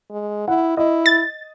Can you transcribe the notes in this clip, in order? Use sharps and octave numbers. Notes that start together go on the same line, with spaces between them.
G#3
E4 F#5
E4 D#5
A6